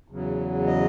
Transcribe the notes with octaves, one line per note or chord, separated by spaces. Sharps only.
E2 C#3 F#3
D#5